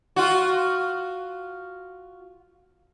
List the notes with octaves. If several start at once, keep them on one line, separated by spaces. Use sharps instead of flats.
F4 F#4